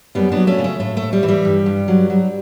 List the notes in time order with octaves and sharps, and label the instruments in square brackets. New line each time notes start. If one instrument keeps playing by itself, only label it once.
[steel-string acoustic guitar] F#2 G3 B3
B3 D4
F#3
A3 C#4
C#3
A3
A2 A3
A3
A2
G3
E3
G3
G2
G2
F#3
F#3